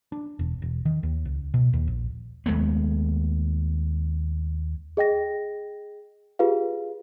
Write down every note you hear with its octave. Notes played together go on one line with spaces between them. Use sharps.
D4
E1
E1
D#3
D#2
C#2
B2
D#2
A#1
D#2 G#3 A3 B3
G#4 D#5 G5 A#6
F4 G4 G#4 B4 F5